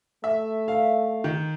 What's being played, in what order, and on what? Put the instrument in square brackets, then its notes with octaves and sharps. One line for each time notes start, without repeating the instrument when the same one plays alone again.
[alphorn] A3 [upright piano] E5
[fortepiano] F5
[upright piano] D#3